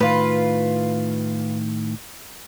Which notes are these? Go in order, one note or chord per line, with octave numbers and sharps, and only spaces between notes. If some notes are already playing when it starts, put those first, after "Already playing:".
A2 D#3 F4 B4